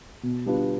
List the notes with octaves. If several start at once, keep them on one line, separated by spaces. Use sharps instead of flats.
B2
G3 B3 D4 F4